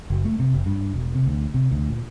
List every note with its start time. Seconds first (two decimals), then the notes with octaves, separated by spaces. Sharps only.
0.10 F#1
0.25 A3
0.39 C3
0.54 F#1
0.66 G2
0.94 E1
1.15 C3
1.27 D2
1.54 C3
1.71 D2
1.89 A#2